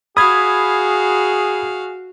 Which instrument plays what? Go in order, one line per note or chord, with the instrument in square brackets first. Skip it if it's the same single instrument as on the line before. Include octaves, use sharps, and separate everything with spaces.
[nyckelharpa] F#4 F5 [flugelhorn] G#4 [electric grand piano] B5 G#6 [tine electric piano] D#6